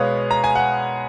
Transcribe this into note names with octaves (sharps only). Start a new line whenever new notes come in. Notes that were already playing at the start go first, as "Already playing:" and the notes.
Already playing: B2 G#3 B3 B4 C#5 F5
A#5
G#5
F#5